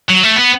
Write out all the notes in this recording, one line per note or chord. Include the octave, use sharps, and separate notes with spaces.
F#3
A3
B3